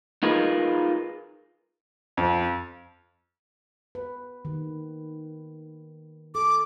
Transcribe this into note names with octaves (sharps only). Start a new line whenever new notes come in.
D#4 F4 G#4 A#4 B4
F2
B4
D#3
A4 D6